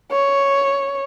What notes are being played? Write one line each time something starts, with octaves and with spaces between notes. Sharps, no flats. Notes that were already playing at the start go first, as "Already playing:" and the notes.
C#5